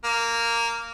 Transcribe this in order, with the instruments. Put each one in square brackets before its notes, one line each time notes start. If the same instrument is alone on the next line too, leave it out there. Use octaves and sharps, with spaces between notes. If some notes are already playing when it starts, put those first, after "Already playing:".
[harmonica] A#3